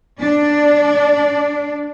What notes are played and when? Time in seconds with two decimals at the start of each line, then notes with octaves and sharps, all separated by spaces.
0.20 D4 D5